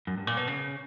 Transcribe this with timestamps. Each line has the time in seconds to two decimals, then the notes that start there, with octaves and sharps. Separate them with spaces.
0.07 F#2
0.17 G2
0.27 A#2
0.37 B2
0.48 C#3